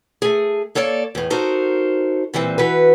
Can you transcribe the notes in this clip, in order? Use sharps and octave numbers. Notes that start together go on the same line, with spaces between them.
A3 G#4
A#3 A4 C#5 D5
E2 A2
D#4 F#4 A4 A#4 C5
A#2 E3 G3 C4
E3 F#4 B4